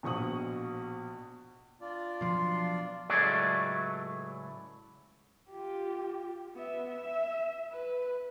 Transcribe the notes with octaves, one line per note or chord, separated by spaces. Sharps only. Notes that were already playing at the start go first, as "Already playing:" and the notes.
A#1 B2 C#6 D#6 F#7
D4 F4 D5
B2 F3 F#3 C6
C#2 A2 F#3 A3 G#4 D5
F4 G4
B3 E5
E5
B4